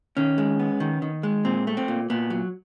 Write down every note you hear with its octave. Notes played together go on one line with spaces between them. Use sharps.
D#3 C#4
G#3
B3
D#3
D#3
G#3
A#2 C4
A3
C4
A#2
A#2 B3
F#3